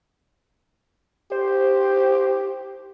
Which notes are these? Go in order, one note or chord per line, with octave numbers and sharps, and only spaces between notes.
G4 C5